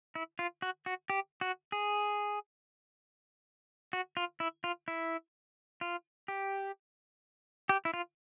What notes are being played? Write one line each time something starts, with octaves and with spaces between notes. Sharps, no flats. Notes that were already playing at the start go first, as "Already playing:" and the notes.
E4
F4
F#4
F#4
G4
F#4
G#4
F#4
F4
E4
F4
E4
F4
G4
G4
E4
F4